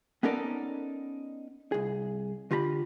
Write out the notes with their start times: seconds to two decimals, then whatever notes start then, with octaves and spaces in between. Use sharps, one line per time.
0.23 B3 C#4 D#4 A4 A#4 D5
1.72 C2 G#4
2.51 D3 F4 G4 A#5 B5